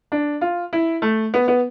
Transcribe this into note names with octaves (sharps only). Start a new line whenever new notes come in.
D4
F4
E4
A3
B3
B3